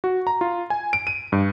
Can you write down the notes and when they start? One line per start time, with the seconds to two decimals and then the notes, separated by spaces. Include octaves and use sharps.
0.04 F#4
0.27 A#5
0.41 F4
0.70 G#5
0.93 D7
1.07 D#7
1.32 G2